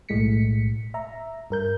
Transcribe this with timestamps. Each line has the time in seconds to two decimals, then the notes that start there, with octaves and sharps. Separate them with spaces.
0.09 B1 A2 G#3 A3 B6 C#7
0.94 E5 A#5
1.50 G2 A#4 G6